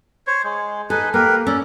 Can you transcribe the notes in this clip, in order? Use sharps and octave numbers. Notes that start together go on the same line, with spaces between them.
C5 C#5
G#3
D#4 A4 B4 G#5
A#3 G4 A#4 B4
C#4 A4 D5